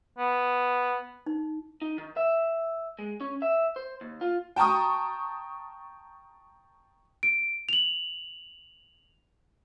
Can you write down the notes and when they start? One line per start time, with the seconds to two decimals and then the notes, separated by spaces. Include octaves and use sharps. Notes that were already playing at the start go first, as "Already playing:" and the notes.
0.18 B3
1.27 D#4
1.82 D#4
1.98 D#3
2.17 E5
2.99 G#3
3.21 C#4
3.42 E5
3.76 C5
4.01 D#2
4.21 F4
4.56 G5 A5 A#5 C#6 D#6
7.23 D7
7.69 F7 F#7